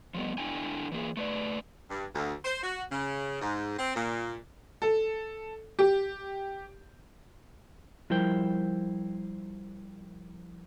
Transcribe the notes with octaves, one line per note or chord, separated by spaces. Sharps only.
F3 G3 B3
D3 D4 E4 G5 G#5
E3 A#3 G#4
A3 B4 D5
G2
D2
C5
F#4
C#3
G#2
C4
A#2
A4
G4
F3 G3 E4 A#4 C5 G5